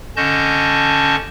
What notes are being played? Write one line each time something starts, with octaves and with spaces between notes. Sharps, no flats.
D3 C#4 D#5 A5 C#6 G6